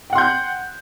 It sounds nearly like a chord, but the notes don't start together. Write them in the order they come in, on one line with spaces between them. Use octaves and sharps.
G5 F#5 C6 G6 F#6